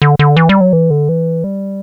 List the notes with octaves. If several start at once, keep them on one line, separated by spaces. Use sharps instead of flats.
D3
D3
E3
G3
F#3
E3
D3
E3
G3